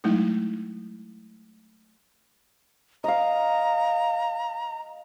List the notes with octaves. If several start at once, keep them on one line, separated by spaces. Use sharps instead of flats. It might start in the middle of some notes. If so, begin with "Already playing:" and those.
F#3 G#3 A3 D#4 E4
D#5 F5 A#5